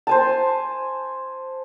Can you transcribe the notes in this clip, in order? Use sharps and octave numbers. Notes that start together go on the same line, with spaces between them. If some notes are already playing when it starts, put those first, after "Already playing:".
C5 G#5 A5